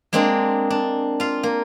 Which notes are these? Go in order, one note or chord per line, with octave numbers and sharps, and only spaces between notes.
G#3 A#3 C4 D4 G#4
D4
F4 F5
A#3